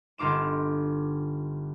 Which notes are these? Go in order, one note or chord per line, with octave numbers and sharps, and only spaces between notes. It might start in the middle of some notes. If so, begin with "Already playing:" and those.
G1 D#4 F4 D6 E7